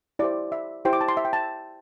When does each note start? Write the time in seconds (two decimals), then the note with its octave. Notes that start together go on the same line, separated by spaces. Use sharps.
0.19 E4 G4 C5 D5
0.52 E5
0.85 E4 G4 C5 G5
0.93 D6
1.01 A5
1.08 C6
1.17 E5
1.25 G5
1.33 A5